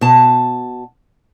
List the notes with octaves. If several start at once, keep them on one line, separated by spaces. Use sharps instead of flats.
B2 A5